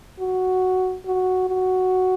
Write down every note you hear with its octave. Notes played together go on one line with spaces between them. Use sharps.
F#4
F#4
F#4